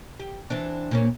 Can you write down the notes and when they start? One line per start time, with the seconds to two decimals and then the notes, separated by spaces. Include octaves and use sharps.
0.19 G4
0.50 E3 C4 D4
0.91 A#2 A#3 C#4